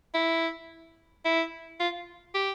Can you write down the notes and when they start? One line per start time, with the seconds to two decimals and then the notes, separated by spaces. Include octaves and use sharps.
0.14 E4
1.25 E4
1.80 F4
2.34 G4